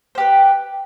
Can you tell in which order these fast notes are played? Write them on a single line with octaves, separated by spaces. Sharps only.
C5 G4 B4